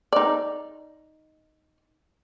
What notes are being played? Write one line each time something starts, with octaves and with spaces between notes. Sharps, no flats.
D#4 D5